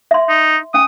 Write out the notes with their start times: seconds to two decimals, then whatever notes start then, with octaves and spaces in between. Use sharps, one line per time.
0.11 E5 C6
0.29 D#4
0.74 C#4 G#5 D#6